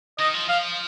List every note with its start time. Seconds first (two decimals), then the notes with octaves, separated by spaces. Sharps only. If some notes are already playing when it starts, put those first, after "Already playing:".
0.19 D#3 D#5
0.34 F3
0.49 F3 F5